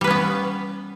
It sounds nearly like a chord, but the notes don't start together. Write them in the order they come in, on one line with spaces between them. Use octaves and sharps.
G3 B4 C#4 B3